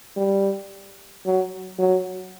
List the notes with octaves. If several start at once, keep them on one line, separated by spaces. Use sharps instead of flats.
G3
F#3
F#3